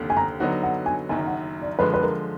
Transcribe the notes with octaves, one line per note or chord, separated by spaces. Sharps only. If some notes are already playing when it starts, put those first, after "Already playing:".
Already playing: F1 D#2 D3
G#5
A#5
D3 F#3 B3 D#4 F#4 F#5
F#5
G#5
F#1 F#2 D#3 G#5
F#5
D5
D3 F3 G#3 B4
B4
A#4